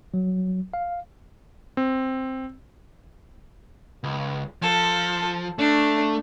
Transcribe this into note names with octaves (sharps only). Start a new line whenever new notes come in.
F#3
F5
C4
C#2
F3 A4
A3 D4